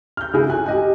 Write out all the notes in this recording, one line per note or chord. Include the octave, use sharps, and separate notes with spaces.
F6 G6
C#3 E4 F#4 G#4
G#5 F#6
G4 D#5 G#5